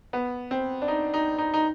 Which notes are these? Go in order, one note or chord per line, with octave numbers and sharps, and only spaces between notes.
B3
C4
D4
D#4
D#4
D#4
D#4